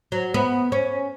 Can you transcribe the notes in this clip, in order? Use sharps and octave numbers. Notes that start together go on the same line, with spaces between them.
F#3
B3
C#4